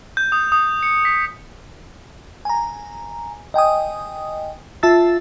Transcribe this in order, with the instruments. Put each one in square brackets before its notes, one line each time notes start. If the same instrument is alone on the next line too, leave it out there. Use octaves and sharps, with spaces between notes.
[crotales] G6
D#6
D#6
C#7
B6
[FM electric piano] G#5 A#5
D#5 G5 G#5 D#6
F4 E5 A5 E6 A6